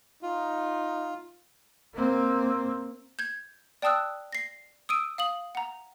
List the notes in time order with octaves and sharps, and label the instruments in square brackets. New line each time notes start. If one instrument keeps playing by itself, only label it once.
[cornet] D#4 [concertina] F4
[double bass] A#3 C4
[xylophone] G6 G#6
D5 G5 A5 D#6 E6 F#6
A#6 C7
D#6 E6 D7 D#7
F5 D#6 F#7
F#5 A#5